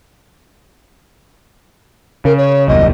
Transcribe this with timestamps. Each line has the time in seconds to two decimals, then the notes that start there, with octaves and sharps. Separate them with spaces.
2.25 C#3 A#4
2.38 C#5
2.68 D#1 C2 F#2 D#5